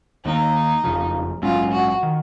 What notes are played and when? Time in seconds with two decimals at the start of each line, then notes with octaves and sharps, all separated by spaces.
0.25 D#2 D#3 A#3 D#4
0.84 F#1 F2 C#3 F3
1.42 A#1 G#2 F#3 C#4 F4
1.72 F#4
2.03 D#3